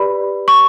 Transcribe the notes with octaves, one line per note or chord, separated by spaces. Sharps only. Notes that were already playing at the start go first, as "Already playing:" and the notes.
Already playing: G4 B4 D5 B5
C#6